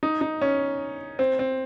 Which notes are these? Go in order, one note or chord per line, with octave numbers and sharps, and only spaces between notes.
D#4
D#4
C#4
C4
C4